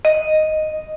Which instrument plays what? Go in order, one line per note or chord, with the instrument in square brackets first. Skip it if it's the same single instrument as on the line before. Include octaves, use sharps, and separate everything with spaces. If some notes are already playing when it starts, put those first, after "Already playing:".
[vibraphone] D#5